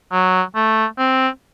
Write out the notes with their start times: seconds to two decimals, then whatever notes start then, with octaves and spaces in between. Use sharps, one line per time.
0.12 F#3
0.55 A3
0.98 C4